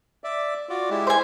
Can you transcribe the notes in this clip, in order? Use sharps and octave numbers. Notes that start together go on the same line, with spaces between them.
D5 E5
F4 F#4 D5
G#3 E4 G4
C5 G#5